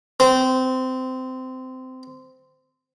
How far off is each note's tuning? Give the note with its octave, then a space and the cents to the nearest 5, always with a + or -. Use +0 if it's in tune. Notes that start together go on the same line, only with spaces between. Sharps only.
C4 -20